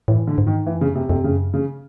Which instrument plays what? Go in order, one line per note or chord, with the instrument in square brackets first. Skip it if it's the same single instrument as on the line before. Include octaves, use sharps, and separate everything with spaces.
[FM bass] A2 [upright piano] E3
[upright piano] D3
[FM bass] G#2
[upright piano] D#3
[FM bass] G2 [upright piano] E3
[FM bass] F2
[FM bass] F#2 [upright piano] C#3
[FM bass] E2 [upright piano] C3
[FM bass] F2 [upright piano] C3
[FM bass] F#2 [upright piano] C#3
[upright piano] C#3